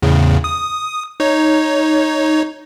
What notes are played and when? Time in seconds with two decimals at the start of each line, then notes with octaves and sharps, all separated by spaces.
0.02 E2 A2 C#3
0.44 D#6
1.20 D#4 C#5